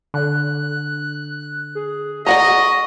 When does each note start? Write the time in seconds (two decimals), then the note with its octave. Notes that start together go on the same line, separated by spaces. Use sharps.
0.14 D3 F#6
1.75 G#4
2.26 D5 D#5 F#5 A#5 C#6